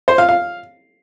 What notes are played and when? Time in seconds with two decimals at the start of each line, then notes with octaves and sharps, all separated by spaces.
0.08 C5
0.18 F5
0.29 F5